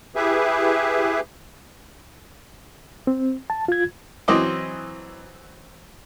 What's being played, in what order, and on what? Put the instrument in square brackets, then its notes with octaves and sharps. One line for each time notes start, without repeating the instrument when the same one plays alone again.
[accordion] E4 G4 G#4 B4 E5
[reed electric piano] C4
A5
F4 G#6
[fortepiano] E3 F#3 C4 D#5 D6